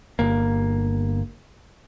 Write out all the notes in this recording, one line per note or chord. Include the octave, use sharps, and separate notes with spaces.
G1 A#3